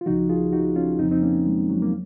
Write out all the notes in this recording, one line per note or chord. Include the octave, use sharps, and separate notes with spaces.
F4
C#2 C#3 F3 D#4 F#4
F4 G#4
D#4 F#4
C#4 F4
F2 C#3 F3 C4 D#4
C4 D#4
A#3 C#4
G#3
F#3
A#3